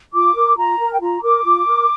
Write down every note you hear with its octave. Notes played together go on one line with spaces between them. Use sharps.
F4 D6
A#4
F4 A#5
A#4
G5
F4 A#5
A#4 D6
F4
A#4